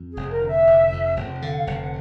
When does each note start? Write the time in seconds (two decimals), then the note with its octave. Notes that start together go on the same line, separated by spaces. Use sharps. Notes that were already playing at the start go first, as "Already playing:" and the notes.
Already playing: F2
0.11 G#4
0.17 F1
0.30 A#4
0.42 D3
0.48 E5
0.67 F1
0.92 F2
1.16 F1
1.41 D3 F5
1.50 F#5
1.57 F5
1.64 F1 F#5
1.73 F5
1.80 F#5